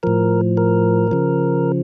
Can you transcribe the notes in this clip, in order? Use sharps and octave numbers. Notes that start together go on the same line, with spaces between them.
A2 F3 A#4
A#4
C#3 F3